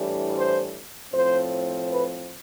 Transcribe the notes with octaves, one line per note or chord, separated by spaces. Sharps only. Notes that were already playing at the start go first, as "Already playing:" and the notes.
Already playing: A2 E3 G3 D4
C5
A2 F3 C4 C5
B4